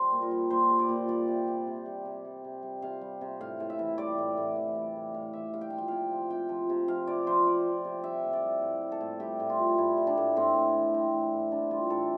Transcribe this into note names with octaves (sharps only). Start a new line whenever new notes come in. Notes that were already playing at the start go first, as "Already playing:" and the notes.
Already playing: G3 C5
A#2
A#4
G3
A#2 C5
G3
D5
A#2
G3 D5
C3
G3
C3
G3
C3
G3
C3
G3
C3 F5
G3
C3
A2 F5
A2
E5
E3
G3 D5
A2
A2
E3
G3
A2
A2 F5
E3 E5
G3 F5
G5
F3 F5
G5
C3 F5
F3
C3 G5
F3
C3
F3 F5
C3 D5
F3 C5
C3 D5
F3
C3
G3 E5
A2
D5
G3
A2
G3
A4
A2
G3 G4
A2
F4
G3
A2 E4
G3
D4
A2
A2 C4
A2
E3
G3 C4
A2
A2
E3 D4
G3 F4
A2 A4